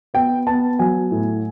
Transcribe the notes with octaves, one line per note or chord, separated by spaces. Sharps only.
B3 G5
B3 A5
F#3 G#5
A2